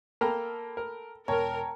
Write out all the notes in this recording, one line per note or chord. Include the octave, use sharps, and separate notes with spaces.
A#3 A4 G5 A#5 B5 F6
A#4
E1 A#4 C#5 G5 A5 A#5